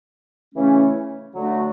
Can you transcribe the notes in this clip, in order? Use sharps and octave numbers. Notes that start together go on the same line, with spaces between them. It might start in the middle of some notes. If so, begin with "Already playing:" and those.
C#3 E3 A3 C#4
D3 F#3 A3 D4 F#4